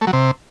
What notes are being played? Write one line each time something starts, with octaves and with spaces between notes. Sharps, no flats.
A3
F#3
C3